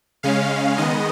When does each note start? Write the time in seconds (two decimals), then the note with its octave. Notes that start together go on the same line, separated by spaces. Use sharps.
0.23 C#3 G#3 C#4 F5
0.78 D#3 G#3 B3 D#5